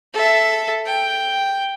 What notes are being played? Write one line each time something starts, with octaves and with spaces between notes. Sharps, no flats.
A4 E5
G5